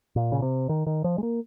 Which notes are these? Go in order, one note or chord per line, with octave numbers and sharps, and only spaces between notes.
A#2
C#3
C3
D#3
D#3
F3
G#3
A#3